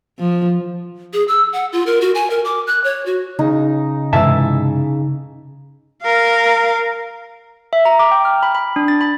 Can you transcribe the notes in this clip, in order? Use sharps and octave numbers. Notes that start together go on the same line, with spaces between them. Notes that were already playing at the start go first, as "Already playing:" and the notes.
F3
G#4
E6
F#5
F4
A#4
F#4
G#5
A#4
D6
F#6
C#5
F#4
C#3 D#4
G2 C3 E3 G#3 E5 A5
A#4 F5
E5
A#5
D6
G5
F6
B5
B5
D4
A6
B5